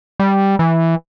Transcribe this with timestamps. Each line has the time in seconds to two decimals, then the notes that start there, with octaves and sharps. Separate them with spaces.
0.20 G3
0.59 E3